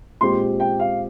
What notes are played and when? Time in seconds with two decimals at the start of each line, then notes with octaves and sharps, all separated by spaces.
0.21 A#2 G#3 C4 G4 C6
0.60 G5
0.80 F5